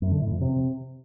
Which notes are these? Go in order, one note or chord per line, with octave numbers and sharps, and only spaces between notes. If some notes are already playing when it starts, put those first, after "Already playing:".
F#2
D3
A2
F2
C3